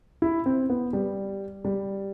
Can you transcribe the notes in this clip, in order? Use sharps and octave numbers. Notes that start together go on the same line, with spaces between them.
E4
C4
B3
G3
G3